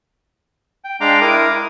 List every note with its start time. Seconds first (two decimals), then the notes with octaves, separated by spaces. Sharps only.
0.84 G5
1.01 G#3 D4 F5 G5 A#5 D6
1.21 E4 A#4 D6 D#6
1.51 E4